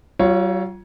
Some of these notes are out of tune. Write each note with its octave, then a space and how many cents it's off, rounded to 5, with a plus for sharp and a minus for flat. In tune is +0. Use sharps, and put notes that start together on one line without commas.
F#3 +45 F4 +0 C#5 +0